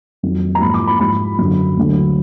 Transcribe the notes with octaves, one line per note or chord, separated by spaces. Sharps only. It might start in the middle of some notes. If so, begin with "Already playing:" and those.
F2 D#3 F#3
A#5
G#2 F3 B5
D6
B5
G#2 F3 B5
F#2 D3 F#3
D2 D3 F#3